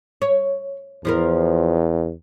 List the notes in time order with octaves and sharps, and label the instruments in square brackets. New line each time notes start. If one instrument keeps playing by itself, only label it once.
[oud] C#5
[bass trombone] E2 [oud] F3 E4 A#4